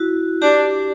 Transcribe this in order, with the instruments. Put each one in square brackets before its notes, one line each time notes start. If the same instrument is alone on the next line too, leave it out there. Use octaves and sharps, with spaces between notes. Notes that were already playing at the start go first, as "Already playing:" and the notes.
Already playing: [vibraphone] E4 F#4
[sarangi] D4 [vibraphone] G4